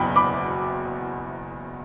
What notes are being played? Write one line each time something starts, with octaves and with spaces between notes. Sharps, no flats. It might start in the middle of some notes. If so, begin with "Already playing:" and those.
Already playing: F#1 E2 B2 F#3 G5 B5
B5 D6